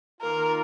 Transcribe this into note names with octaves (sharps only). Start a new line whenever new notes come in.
D#3 A#3 F4 A#4